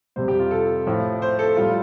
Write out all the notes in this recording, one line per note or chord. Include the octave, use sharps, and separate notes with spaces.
F2 C3 G3 C5
G4
F4
A4
A2 F3
C5
A4
A2 G3 F4